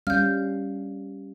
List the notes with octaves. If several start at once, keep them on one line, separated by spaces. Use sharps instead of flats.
G3 C#4 F5 F6 G6